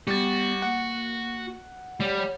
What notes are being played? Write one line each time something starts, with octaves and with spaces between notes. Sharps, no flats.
G3 B3 F#4 A6
A#3 F#5
G3 C#5
C#5